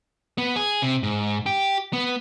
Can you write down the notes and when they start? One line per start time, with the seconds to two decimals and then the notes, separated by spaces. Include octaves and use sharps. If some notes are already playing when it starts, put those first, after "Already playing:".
0.38 B3
0.56 G#4
0.83 C3
1.03 G#2
1.46 G4
1.93 B3